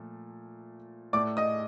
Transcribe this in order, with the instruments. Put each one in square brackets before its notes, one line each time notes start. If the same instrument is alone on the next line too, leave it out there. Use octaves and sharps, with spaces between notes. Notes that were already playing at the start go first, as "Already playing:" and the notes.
Already playing: [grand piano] A#2 F3 A3
A2 A3 D5 D6
D#5 D#6